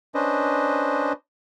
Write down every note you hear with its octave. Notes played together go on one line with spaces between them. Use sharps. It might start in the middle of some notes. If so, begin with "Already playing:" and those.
C#4 D4 B4 C5 D#5